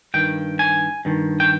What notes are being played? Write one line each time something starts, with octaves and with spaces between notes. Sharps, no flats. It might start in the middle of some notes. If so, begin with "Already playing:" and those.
G2 D#3 G5
G#5
G2 D#3
G5